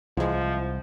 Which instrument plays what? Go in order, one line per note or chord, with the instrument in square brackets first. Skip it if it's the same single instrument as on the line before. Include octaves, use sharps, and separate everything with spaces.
[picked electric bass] C2 [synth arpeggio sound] E3 G#3 [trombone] F3